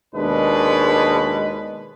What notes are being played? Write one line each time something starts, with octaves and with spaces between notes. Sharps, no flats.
D#2 B2 G#3 D4 B4